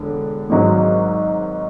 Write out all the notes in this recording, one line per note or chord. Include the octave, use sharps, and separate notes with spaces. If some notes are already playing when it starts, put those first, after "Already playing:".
Already playing: E1 D3
G#1 G#2 F#3